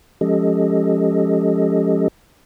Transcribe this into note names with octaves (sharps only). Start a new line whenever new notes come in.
F3 G#3 C#4 G4 A4 D#5